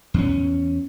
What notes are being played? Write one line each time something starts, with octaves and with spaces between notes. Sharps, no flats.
E2 C4 C#4